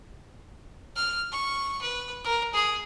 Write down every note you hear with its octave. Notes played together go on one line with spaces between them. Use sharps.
F6
C#6
B4
A#4
G#4